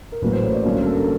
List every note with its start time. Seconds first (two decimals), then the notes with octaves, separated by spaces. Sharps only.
0.12 A#4
0.22 A1 A2 F#3 A#3 B4
0.33 C5
0.44 C#5
0.54 D5
0.64 G2 D3 F#3 A#3 C#4
0.80 A#4
0.86 A4